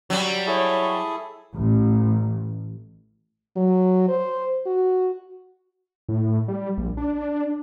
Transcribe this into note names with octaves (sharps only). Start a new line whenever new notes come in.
F#3 G3
E4 G#4 A4 C#5
A1
F#3
C5
F#4
A2
G3
A#1
D4